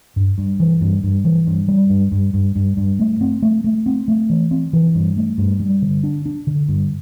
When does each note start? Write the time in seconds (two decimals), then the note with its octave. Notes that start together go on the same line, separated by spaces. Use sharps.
0.16 G2
0.38 G2
0.60 E3
0.81 G2
1.04 G2
1.25 E3
1.47 G2
1.68 G3
1.90 G2
2.12 G2
2.34 G2
2.56 G2
2.77 G2
2.99 A3
3.21 C4
3.42 A3
3.64 A3
3.86 C4
4.08 A3
4.30 E3
4.51 C4
4.73 E3
4.95 G2
5.16 A3
5.38 G2
5.60 G3
5.82 D3
6.03 D4
6.26 D4
6.47 D3
6.69 G2